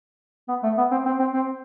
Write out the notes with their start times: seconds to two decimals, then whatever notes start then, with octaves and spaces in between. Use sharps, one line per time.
0.49 B3
0.63 A3
0.77 B3
0.91 C4
1.06 C4
1.20 C4
1.33 C4